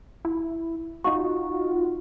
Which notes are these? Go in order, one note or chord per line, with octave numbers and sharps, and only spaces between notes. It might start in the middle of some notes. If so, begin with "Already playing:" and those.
E4
D#4 F4 F#4 C#6